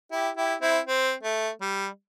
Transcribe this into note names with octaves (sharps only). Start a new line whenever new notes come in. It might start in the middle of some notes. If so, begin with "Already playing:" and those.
E4 G4
E4 G4
C4 E4
C4
A3
G3